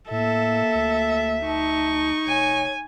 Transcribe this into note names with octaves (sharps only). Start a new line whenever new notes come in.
A2 A#3 A4 E5
D2
D#4 A5 C#6
F1 C#5 G#5